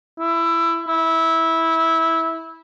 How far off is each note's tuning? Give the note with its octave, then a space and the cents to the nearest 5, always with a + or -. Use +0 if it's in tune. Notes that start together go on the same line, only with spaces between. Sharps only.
E4 +20
E4 -15